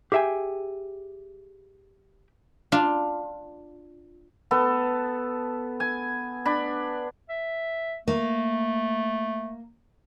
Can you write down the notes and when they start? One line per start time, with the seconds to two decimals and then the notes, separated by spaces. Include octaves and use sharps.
0.12 G4 G#4 E5 G5 G#5
2.72 D4 F4
4.51 B3 A4
5.80 G#5
6.45 D4 B5
7.29 E5
8.08 A3 A#3